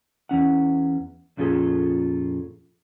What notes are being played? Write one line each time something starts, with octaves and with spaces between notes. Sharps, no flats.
E2 C#4 F#5
F2 A#2 C#4 F4 G#4 A4